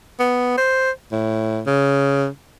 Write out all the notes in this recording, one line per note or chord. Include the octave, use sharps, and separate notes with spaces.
B3
C5
A2
C#3